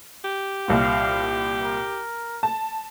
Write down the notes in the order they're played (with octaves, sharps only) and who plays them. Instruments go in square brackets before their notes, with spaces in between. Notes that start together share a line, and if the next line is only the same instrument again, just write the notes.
[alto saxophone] G4
[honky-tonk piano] C2 A#2 [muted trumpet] F5
[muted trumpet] A#4
[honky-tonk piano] A5